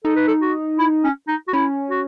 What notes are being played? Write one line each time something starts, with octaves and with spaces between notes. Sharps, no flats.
D#4 A4
B4
A4
F#4
E4
C#4
D#4
F#4
C#4 E4
F#4